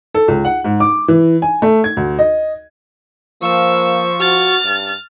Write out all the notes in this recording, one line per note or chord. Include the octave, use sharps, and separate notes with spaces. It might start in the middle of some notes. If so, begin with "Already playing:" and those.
A4
C#2
F#5
G#2
D6
E3
G#5
A3
G#6
D2
D#5
F3 A#3 C#6 E6
F#4 F6 A6
G2